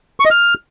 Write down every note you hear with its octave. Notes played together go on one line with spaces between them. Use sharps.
C#6
D#5
F6